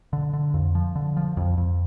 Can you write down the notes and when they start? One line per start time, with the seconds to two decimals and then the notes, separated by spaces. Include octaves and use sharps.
0.13 D3
0.33 D3
0.54 F2
0.75 F3
0.95 D3
1.17 F3
1.37 F2
1.57 F2